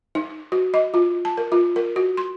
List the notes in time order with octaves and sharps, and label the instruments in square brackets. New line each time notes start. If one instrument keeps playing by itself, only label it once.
[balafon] D#4
F#4
D#5
F4
A5
A#4
F4
A#4
F#4
C6